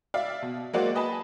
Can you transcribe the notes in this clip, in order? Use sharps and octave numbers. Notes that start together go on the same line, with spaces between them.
D5 E5 F5
B2
F#3 G#3 A#3 F#4 C5 D5
B4 D#5 G#5 A5 B5